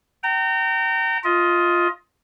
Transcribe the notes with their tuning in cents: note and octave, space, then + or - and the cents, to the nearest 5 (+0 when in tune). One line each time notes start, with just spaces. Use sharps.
G5 -35 A#5 -30
F4 +0 D#5 +20